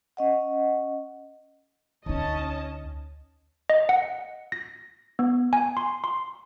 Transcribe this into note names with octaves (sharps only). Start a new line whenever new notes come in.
C#4 D#5 F#5
D2 C#4 D#4 D#5 A5
D#5
F#5
A#6
B3
G#5
C6
C6